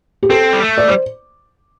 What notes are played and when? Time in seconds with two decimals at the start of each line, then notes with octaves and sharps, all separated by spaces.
0.23 G4
0.30 C4 A4
0.53 G3
0.62 A3
0.78 D5
0.88 G3 C5